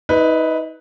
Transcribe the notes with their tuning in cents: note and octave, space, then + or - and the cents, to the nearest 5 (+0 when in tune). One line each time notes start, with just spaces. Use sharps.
D#4 +35 B4 +0 D#5 -40